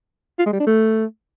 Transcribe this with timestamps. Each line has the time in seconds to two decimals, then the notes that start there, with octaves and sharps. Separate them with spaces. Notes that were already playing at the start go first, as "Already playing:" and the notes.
0.39 F4
0.46 G#3
0.53 G3
0.60 D4
0.67 A3